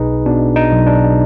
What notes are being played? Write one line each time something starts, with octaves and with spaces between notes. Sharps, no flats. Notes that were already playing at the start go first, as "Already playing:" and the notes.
Already playing: B1 B2 D#4 G#4 B4
B2 D4
D#4
B1
D4